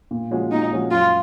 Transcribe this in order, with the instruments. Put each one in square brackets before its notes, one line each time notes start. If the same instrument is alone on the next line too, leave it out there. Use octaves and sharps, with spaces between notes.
[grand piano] A#2
F3 G#3 C#4 F#4
[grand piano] A#2 [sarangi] D#4
[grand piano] F3 G#3 C#4 F#4
[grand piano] F#2 [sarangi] F4